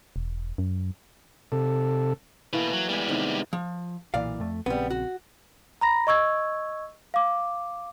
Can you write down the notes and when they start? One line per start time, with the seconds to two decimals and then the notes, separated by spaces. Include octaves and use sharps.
0.16 E1
0.58 F#2
1.52 C3 A4
2.53 B2 E3 A3 A#3 B4
2.73 F#3
2.89 G3 G#3 B3 G#5
3.09 C3 D#3 B3
3.53 F3
4.14 B1 A#2 E3 D5 F5
4.40 F2 A3
4.66 A#1 C#3 G3 B3 C4
4.90 F#4
5.81 A#5 B5 A#6
6.07 D#5 C#6 E6 G#6
7.14 F5 D6